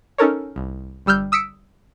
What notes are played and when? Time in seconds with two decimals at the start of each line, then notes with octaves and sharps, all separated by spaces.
0.18 C#4 D#4 A4 A#4 C#5
0.56 C2
1.06 G1 G3 E6 F6 G6
1.32 D#6 E6 B6 C#7 D7